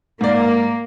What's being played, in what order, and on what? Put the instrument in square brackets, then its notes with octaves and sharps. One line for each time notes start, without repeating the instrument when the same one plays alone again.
[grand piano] G#2 D5 [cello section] A#3